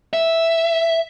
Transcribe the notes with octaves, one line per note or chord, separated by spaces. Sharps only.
E5